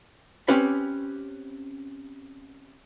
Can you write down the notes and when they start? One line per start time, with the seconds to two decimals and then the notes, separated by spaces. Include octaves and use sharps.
0.48 C4 C#4 G4 B4 C#5